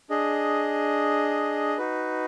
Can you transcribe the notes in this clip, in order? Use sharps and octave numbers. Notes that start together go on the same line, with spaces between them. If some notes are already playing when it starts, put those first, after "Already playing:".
D4 G#4 D#5
D#4 F#4 B4